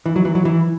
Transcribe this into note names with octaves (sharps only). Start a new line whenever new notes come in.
E3
F#3
E3
F#3
E3